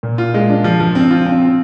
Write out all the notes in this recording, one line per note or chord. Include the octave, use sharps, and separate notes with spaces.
A#2
F4
G#3
D4
F3
F3
C4
F4
C4
C4